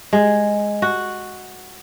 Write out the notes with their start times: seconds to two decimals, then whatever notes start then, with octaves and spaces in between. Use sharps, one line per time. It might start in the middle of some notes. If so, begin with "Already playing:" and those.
0.13 G#3
0.82 F#4